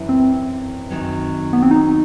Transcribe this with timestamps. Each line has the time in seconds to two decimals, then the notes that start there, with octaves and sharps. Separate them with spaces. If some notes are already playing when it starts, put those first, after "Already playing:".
Already playing: F#2 E3 E4
0.09 C4
0.90 F#2 D#3 F#3
1.53 B3
1.62 C4
1.71 D#4